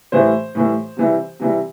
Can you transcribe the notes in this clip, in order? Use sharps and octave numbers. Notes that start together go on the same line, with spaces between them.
A2 E3 G3 C5
A2 E3 G3
C3 E3 G3
C3 E3 G3